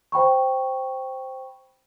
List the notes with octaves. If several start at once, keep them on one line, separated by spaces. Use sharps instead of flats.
C5 G5 B5 C#6